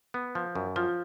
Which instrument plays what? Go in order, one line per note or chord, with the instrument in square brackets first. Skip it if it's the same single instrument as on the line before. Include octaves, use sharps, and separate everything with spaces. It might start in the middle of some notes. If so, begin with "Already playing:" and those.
[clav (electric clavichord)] B3
F3
F#2
[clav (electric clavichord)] F3 [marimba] F4